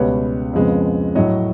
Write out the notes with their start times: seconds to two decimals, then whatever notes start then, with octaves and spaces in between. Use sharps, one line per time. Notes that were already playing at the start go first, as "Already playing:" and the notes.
Already playing: C#2 B2 G3 B4 C#5
0.53 F2 C#3 F3 G#3 B3
1.15 A2 F#3 A3 C#5 D#5